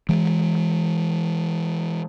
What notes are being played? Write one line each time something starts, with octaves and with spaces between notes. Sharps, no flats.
E3 G#3